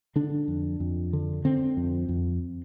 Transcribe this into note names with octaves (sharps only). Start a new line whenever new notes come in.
D3 D4
F2
F2
D3
D3 C4
F2
F2